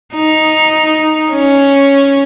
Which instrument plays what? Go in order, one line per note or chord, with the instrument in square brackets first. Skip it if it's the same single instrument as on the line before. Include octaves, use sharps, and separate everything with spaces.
[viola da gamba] D#4
C#4